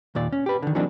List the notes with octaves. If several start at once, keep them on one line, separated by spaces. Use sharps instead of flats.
D#2 A#2 D5
C#4
G4 B4
D3 D#3
E3 F#3 A#3 C4 D4 D#4